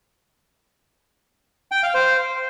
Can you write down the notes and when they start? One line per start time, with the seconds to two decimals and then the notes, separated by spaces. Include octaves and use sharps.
1.72 G5
1.83 F5
1.94 C5